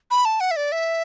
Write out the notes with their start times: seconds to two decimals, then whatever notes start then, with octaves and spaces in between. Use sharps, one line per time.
0.11 B5
0.25 A5
0.40 F#5
0.51 E5
0.56 D5
0.72 E5